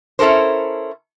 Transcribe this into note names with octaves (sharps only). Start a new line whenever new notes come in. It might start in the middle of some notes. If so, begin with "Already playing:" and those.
C#4 E4 A4 A#4 C5